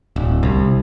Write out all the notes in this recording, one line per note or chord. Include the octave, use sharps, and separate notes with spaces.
D1
C2